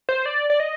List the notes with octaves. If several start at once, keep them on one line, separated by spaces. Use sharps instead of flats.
C5
D5
D5
D#5